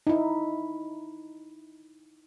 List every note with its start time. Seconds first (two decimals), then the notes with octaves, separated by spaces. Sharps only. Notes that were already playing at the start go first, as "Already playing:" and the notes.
0.07 D#4 E4